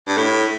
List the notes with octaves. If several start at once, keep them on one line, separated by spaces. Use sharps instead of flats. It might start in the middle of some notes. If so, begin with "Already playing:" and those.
G2
A2